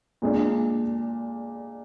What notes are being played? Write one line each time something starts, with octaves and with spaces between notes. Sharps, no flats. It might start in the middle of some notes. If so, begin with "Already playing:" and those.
A#2 G#3 D4